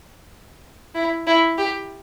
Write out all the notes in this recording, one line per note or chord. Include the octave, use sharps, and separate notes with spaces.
E4
E4
G4